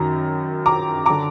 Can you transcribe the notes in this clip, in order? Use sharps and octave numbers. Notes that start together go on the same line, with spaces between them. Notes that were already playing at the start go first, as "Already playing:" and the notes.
Already playing: F#2 D#3 A#5
A#5 D6
D3 A#5 D6